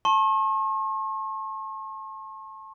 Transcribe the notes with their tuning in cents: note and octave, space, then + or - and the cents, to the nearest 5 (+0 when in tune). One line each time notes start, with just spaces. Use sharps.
A5 +0 C#6 -45